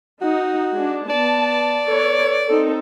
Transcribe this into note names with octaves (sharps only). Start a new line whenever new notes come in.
D#4 F#4
G#3 D4
B3 D5 A5
A4 B4 C#5
C4 D#4 A4